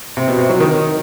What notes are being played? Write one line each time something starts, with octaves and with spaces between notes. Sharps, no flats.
C3
B2
C3
F#3
D#3